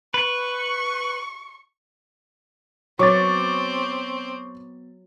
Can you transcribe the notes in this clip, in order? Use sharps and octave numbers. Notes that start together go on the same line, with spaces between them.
B4 C#6
F#3 B3 C4 C#6 D6 A6